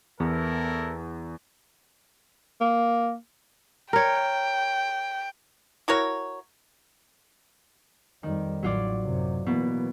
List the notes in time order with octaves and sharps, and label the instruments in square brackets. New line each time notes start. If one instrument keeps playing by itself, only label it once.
[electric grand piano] E2 [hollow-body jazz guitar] B3 [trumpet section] E4 A4 A#4
[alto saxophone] A#3
[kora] A#4 C#5 [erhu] G5
[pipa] E4 F#4 A#4 C#5
[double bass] F2 G3 [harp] D#3
[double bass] A1 [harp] F#3 F4 D5
[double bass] F#2 C3
[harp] B2 [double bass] E3 A#3